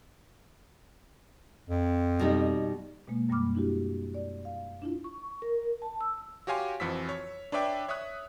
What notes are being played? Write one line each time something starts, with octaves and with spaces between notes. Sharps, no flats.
F2
B2 G3 D#4
B2 G#3 A#3
F#2 G3 A#3 B5 D6 F6
D4 E4 F#4 G4
D5
F5
D4 E4 F4
C#6
A#4
A5
E6
F#4 G4 C#5 F5 G#5 C6
F2 E3 F3 F#4 E6 B6
C#5
D4 B4 C#5 D5 E5 G5
C#5 E5 C#6 D#6 F#6